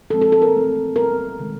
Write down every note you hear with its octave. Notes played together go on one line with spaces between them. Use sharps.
A#2 F3 G#3 C4 A4
A4
A4
A#4
E3 A3 C4
A#2 G3 B3 A#4
C3 D#3 G#3